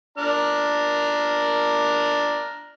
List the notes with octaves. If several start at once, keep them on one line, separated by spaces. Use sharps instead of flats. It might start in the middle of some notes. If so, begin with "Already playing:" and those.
D4 A#5 F6